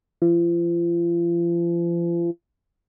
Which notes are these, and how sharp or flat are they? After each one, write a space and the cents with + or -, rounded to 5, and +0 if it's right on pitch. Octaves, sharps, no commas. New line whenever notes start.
F3 -40